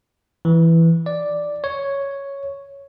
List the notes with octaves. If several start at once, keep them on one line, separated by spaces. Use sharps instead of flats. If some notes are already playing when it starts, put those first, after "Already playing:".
E3
D5
C#5